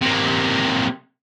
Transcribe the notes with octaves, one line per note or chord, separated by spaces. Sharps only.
C3 A#3